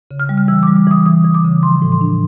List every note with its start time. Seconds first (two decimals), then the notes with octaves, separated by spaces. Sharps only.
0.11 C#3
0.20 F6
0.29 G3
0.38 F6
0.48 E3 E6
0.63 D6
0.67 G3
0.76 D6
0.87 E3 D#6
1.06 E3 D#6
1.24 E3
1.34 D6
1.44 C#3
1.63 F3 C6
1.82 A2
1.92 C6
2.01 D4